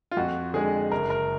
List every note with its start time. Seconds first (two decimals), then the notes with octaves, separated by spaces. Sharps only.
0.11 F4
0.17 F2 F#4
0.54 D3 G#3 G#4
0.92 F#1 A#4
1.10 A#4